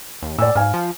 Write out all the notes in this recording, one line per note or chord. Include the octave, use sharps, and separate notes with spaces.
D#2
A2 D5 G#5 E6
G#2 F5 G#5 F6
F3